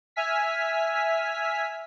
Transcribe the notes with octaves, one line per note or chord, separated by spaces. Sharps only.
E5 G#5 F6 B6